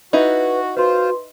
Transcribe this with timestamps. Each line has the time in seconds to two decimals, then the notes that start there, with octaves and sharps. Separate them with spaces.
0.13 D#4 E4 F#4 B4
0.77 F4 F#4 B4 C5 C6